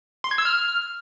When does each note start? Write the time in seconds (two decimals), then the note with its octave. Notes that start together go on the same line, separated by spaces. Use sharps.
0.24 C6
0.31 G#6
0.38 E6
0.45 F6